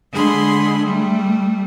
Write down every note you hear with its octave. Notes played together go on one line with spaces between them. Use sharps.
D3 G#3 G#4 B5 C6
G3 A3